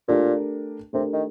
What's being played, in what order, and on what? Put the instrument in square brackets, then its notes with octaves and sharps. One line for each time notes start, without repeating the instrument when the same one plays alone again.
[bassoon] A#2 [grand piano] A3 D4 G4 A#4
[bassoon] C3 [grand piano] A3 D4 G4 A#4
[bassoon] D#3